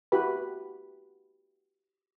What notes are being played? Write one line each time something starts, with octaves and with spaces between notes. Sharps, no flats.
E4 F#4 G4 B4 B5